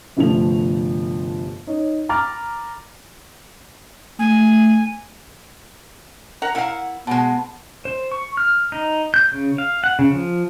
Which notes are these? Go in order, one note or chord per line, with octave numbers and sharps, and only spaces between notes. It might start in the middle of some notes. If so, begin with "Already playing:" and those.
G1 C3 F3 A3 F7
D#4 C#5
A#5 B5 D6 F6 A6
A3 G#5
A#4 F#5 A#5
E4 A#4 F5 F#5
B2 G#3 B3 A5
C5
C#6
F6
D#4
G6
C#3
F5
F#5
C#3
F3